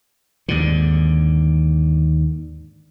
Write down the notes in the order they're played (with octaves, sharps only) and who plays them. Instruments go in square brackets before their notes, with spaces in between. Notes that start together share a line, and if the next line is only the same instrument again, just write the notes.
[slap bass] D#2 G#2 D3